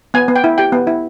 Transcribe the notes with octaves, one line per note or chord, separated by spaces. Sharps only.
B3 G#5
B3
G5
E4
G4 G5
B3
E4